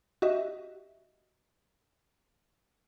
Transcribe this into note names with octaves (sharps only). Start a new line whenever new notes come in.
F#4 G4 D#5 E5